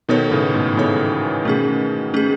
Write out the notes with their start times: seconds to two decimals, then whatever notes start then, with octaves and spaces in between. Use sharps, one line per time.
0.09 B2 D#3 B3 D#4 A4 C#5
0.31 A2 C#3
0.54 G#2 B2
0.77 C#3 E3 B3 D#4 A4 C#5
1.45 B2 D#3 A3 C#4 G#4
2.14 A3 C#4 G#4